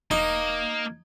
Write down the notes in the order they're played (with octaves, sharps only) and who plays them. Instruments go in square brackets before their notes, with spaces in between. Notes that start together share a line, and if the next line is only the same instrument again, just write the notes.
[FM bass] E1 [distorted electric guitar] A#3 [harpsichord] D#4